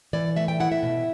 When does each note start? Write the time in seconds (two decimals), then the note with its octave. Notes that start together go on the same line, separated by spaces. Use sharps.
0.13 E3 D5
0.36 A3 E5
0.48 G5
0.60 E4 F#5
0.72 E5
0.83 B2